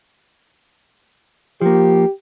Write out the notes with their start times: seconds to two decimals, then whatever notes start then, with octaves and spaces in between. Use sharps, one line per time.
1.61 F3 A#3 G4